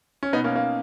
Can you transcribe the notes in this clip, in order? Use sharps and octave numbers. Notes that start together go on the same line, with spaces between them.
C#4
B2 B3 D#4
A#3 C#4
A#3